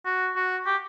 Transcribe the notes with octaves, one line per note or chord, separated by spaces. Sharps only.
F#4
F#4
G4